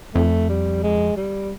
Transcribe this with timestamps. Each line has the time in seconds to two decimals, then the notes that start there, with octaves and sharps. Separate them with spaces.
0.14 F2 A3
0.49 G3
0.83 G#3
1.16 G3